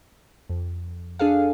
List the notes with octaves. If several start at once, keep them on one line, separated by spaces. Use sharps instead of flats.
F2
D4 G#4 A4 F5